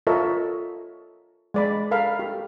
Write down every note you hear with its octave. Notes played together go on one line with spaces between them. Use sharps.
F4 A4 A#4 C#5 D#5 E5
G#3 D5 B5
A4 A#4 F5 B5
G4